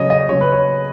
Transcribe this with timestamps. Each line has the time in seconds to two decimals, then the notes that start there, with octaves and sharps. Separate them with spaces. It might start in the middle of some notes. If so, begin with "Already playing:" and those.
Already playing: C#3 F#3 C#4 C#5 D#5
0.10 D#5
0.29 C#3 F#3 C#4 C#5
0.41 B4
0.52 C#5